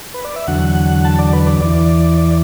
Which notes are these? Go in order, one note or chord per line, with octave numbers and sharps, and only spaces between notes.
B4
D5
E5
E2 D3 F#3 F#5
A5
D5
B4
D5
E2 E3 D5
D5